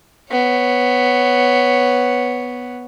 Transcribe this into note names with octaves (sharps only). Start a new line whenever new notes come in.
B3 C#5